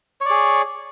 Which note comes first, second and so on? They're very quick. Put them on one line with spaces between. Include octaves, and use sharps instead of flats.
C#5 D5 G#4